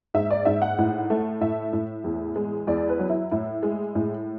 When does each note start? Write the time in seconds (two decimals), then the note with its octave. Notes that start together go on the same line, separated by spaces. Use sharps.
0.14 G#2 E5
0.31 D5
0.45 G#2 E5
0.62 F#5
0.78 A2
1.10 A3
1.41 A2 E5
1.73 A2
2.04 E2
2.36 G#3
2.67 E2 D5
2.89 B4
2.99 F#3
3.09 E4
3.31 A2 E4
3.63 G#3
3.95 A2